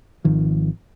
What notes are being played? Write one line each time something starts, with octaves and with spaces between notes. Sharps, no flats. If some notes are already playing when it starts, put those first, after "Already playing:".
G#1 D#3 F3